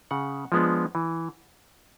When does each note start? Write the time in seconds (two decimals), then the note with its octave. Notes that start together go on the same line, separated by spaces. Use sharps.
0.11 C#3 F#5
0.52 F3 G#3 B3 D4
0.95 E3